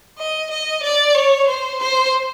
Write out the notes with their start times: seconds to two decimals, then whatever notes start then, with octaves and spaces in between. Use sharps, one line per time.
0.18 D#5
0.50 D#5
0.84 D5
1.15 C#5
1.48 C5
1.79 C5